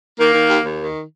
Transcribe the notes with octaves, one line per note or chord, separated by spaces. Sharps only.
D#3 A#3
D#3
D#2
D#2
D#3